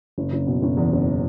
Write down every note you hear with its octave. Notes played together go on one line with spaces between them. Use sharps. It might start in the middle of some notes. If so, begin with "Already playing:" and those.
F#1
F#1
B2
F#1
E2
F#1